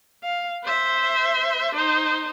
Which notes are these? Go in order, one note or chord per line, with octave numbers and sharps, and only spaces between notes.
F5
C5 E5
D#4 C5